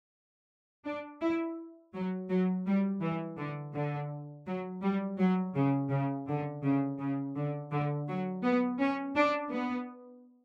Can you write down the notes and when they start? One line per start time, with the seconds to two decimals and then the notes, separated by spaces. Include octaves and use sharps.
0.85 D4
1.22 E4
1.94 F#3
2.30 F#3
2.66 G3
3.02 E3
3.38 D3
3.74 D3
4.47 F#3
4.83 G3
5.18 F#3
5.55 C#3
5.90 C#3
6.27 D3
6.63 C#3
6.99 C#3
7.35 D3
7.71 D3
8.08 F#3
8.44 B3
8.80 C#4
9.16 D4
9.52 B3